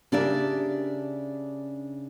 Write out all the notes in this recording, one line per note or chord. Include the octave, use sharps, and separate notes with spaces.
C#3 D4 G4 A#4 D5 E5